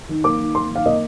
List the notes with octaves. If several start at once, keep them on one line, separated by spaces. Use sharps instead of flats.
D#3
A#3 D6
D#3
A#3 C6
D#3
F5
A#3 D#5